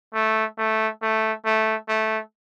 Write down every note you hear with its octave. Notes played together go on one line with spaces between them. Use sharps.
A3
A3
A3
A3
A3